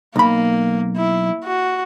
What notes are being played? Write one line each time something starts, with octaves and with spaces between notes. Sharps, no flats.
B1 A#3 B5
E4
F#4